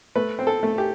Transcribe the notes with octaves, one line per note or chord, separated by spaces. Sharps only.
A3 B4
C4
A4
A3
G4